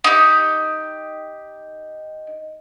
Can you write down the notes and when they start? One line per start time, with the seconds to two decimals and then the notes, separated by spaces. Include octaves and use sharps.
0.04 D#4 G4